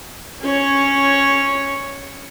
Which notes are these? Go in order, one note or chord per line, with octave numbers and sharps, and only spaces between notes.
C#4 C#5